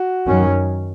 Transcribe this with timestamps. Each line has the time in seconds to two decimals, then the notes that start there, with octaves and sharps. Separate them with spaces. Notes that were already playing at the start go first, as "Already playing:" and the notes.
Already playing: F#4
0.27 F#2 D#3 F#3 C#4